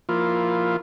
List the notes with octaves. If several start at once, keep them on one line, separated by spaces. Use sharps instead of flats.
F3 A#3 E4 F4